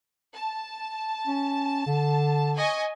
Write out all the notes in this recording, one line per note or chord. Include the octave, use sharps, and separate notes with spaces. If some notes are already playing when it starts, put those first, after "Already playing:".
A5
C#4
D3
D#5 G#5 C#6